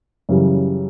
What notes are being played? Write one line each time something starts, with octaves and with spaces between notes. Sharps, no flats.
F#2 C#3 E3 G3